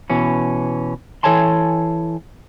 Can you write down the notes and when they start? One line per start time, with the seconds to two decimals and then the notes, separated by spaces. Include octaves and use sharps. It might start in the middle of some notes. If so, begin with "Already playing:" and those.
0.10 B2 E3 C#4
1.23 E3 A4 C#5 G#5 A5 C6